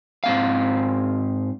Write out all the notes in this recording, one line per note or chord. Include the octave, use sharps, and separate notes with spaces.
G#2 C4 F5